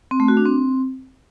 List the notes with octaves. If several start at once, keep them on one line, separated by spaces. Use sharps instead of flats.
C4
A3
F#4
D4
C4